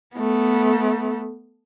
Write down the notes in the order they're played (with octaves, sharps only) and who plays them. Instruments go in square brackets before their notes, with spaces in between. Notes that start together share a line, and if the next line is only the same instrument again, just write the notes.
[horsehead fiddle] A3 B3